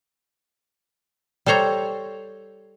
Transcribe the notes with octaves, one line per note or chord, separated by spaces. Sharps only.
G3 A4 C5 C#5 A#5